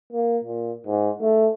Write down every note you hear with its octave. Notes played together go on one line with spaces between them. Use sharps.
A#3
A#2
G#2
A3